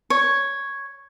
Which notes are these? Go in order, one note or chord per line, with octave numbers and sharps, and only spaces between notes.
C#5